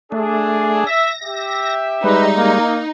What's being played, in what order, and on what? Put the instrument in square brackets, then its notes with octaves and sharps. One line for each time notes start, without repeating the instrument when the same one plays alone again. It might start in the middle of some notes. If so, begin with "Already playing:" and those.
[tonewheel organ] A3 [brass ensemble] D4 G#4
[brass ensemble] E5 [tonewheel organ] A#6
[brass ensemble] G4 E5
[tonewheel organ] G3 G#3 [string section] D#4 [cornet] B4
[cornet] A#3